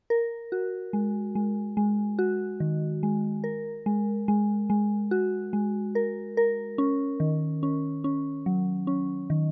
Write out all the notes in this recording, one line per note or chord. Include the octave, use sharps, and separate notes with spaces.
A#4
F#4
G#3
G#3
G#3
F#4
D#3
G#3
A#4
G#3
G#3
G#3
F#4
G#3
A#4
A#4
C#4
D#3
C#4
C#4
F#3
C#4
D#3